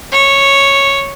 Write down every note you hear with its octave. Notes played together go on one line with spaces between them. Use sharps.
C#5